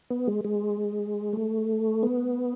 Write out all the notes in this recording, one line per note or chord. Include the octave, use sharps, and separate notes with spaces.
B3
G#3
G#3
A3
B3